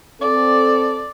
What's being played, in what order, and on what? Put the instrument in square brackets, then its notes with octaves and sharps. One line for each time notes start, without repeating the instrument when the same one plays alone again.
[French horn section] C4 A4 [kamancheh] D5